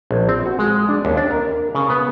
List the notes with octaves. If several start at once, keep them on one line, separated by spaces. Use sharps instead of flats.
A#1
C4
F#4
G#3
D4
D#2
D4
A#4
C#3
B3